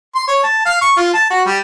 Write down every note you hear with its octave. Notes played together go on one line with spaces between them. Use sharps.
C6
C#5
A5
F5
C#6
F4
A5
F#4
G3